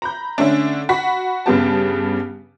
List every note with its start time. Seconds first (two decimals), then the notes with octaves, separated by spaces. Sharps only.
0.02 A#5 B5 G6
0.38 D3 A3 C#4 D4
0.89 F#4 B5 C#6 B6
1.46 G2 C#3 B3 G4 A5